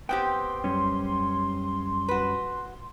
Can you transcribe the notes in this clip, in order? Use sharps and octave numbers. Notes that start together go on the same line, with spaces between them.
B3 C4 G4 G5 C6
F#2 G3 C#4
F#4 B4